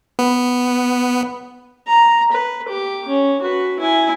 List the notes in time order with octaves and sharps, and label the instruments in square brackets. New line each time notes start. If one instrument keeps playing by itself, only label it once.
[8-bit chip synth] B3
[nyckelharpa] A#5
B4
G4 D6
C#4
F#4 B4
E4 G#5